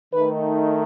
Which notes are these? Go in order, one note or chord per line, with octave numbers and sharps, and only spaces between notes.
D#3 A3 D#4 B4